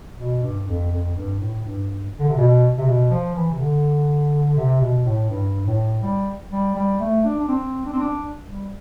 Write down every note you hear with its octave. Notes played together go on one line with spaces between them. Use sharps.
B2
G2
F2
F2
G2
A2
G2
D3
C3
B2
C3
B2
F3
E3
C3
D3
C3
B2
A2
G2
A2
G3
G3
G3
A3
D4
D4
C4
D4
C4
D4
G3